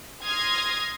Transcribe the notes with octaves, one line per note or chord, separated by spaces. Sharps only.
C6 D#6 F6 G#6 A#6 C7